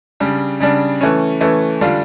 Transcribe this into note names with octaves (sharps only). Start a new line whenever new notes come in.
C#3 G3 D4
C#3 G3 D4
E3 A3 C#4
E3 A3 C#4
D3 G3 D4 F4